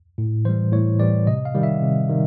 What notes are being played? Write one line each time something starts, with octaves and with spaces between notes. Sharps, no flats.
A2
E3 G3 C5
A2 C#5
E3 G3 D5
C3 D#5
F5
D#3 G3
E5
C3
D#3 G3